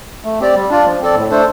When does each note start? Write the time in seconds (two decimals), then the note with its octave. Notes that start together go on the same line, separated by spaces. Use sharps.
0.24 A3
0.40 C4 G4 D5
0.55 G3
0.69 D4 F4 D5
0.85 F3
1.00 C4 A4 D5
1.15 A2
1.30 A3 D4 A4 C5